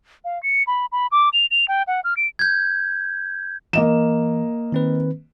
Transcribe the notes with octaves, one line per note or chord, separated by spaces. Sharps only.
F5
C#7
B5
B5
D6
F7
F7
G5
F#5
F6
D7
G6 G#6
E3 A#3 D#5 E7
D#3 C4 B4